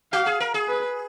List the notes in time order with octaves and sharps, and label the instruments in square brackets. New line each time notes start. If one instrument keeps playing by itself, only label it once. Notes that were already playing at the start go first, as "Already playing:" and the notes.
[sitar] F#4 [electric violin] F5
[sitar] G#4
A#4
G#4
[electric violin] B4